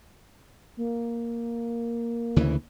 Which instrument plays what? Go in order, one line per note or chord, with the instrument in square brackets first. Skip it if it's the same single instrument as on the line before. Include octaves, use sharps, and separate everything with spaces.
[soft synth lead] A#3
[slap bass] D2 C#3 E3